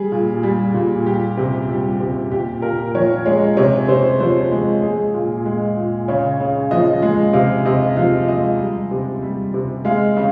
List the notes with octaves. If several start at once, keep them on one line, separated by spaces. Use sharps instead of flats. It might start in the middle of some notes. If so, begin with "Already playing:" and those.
Already playing: G3 G#4
A#2
G3
A#2
G3 G4
C3
G3
C3
A#2 G4
A#2 A#4
F3 C#5
G#3 C#5
C3 C#5
C3 C5
F3 C5
G#3
G#3 G#4
A#2
G#3
A#2
C#3 C#5
C#3
F3 D#5
G#3
C3 F5
C3 D#5
F3 F5
G#3 D#5
G3
C3
G3
C3
G#3 F5
C#3